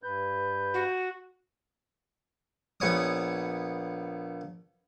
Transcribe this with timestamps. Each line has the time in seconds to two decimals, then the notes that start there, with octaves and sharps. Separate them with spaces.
0.03 G2 B4 G6
0.74 F#4
2.80 A#1 B3 C#5 D#6